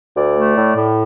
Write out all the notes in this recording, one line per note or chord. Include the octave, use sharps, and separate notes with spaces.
D2 D5
A3
A2
A2